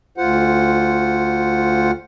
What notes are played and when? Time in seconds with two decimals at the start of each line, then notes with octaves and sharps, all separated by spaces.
0.18 D2 F4 C5 F#5